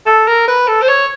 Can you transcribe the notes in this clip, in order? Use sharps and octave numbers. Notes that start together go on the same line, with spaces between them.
A4
A#4
B4
A4
C5
C#5